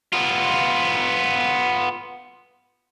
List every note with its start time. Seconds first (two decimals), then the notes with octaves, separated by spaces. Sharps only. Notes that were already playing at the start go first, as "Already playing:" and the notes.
0.13 B3 F4